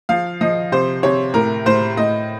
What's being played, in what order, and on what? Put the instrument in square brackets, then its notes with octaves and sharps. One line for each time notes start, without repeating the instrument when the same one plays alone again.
[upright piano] F3 F5
F3 D#5
C3 C5
C3 C#5
A2 A#4
A2 C5
A2 D#5